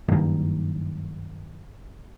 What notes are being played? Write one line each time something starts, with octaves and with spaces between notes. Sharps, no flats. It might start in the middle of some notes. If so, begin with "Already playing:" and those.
F#1 G2 D#3 A#3